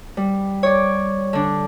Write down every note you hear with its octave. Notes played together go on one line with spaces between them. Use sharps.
G3
C#5 D5
D3 D4